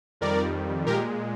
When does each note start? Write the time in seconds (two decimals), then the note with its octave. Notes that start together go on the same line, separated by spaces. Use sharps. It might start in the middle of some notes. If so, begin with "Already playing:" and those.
0.21 F2 D#3 G3 A#4 D5
0.86 A#2 G#3 G4 A#4